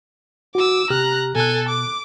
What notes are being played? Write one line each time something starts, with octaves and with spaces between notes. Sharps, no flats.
F#4 D6 E6
C3 G4 A#5 F6 F#6
B2 A4 G#5 F#6
D6